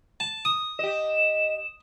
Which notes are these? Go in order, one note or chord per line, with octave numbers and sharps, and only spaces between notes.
A5
D#6
G4 D#5 E7